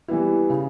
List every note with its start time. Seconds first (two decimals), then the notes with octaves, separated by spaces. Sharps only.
0.08 E3 G3 B3 E4
0.50 C#3